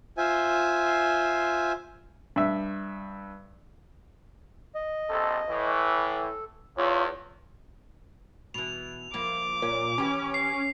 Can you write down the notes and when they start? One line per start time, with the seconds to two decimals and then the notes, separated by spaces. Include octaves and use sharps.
0.18 F4 C5 E5 G#5
2.36 G2 E5
4.75 D#5
5.08 A#1 C3 A4
5.49 A2 E3
5.94 A4
6.78 E2 F4 C#5
8.54 B2 E3 F7
9.14 F3 A#3 E4 D6
9.62 A#2 C#4
9.98 E3 C#4 G4
10.34 C7